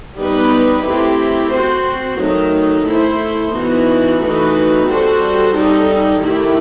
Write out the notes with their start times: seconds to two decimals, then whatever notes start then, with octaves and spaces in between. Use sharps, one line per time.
0.17 G3 B3 D#4 G4 B4
0.84 A3 C4 E4 G4
1.52 C4 F#4 C5
2.19 D#3 F#3 A3 D#4
2.86 A3 E4 A4 C5
3.53 E3 B3 D#4 F#4
4.20 E3 A3 D#4 F#4 B4
4.87 G3 C4 F#4 A4 C5
5.54 G3 D#4 A4
6.21 D#3 A3 E4 G4